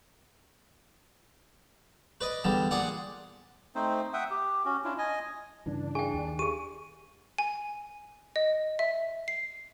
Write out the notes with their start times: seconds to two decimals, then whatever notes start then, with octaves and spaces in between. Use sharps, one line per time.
2.21 B4 D5 D#5
2.44 E2 D3 G3 A5
2.71 A#2 G#4 D5 F#5
3.75 A3 C4 D#4 C5
4.13 E5 F#5 G5 D#6
4.31 G4
4.65 C#4 F#4
4.85 C#4 D4 E4 F4
4.98 D#5 G#5
5.66 G2 C#3 E3 D4
5.95 G#4 G5 G#5
6.14 D#2
6.39 G4 G#4 D#7
7.38 G#5
8.36 D#5
8.79 E5
9.28 C7